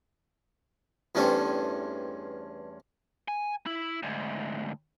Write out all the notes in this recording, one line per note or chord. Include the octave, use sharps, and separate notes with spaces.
E2 G2 A3 C4 C#4
G#5
E4
D2 G#2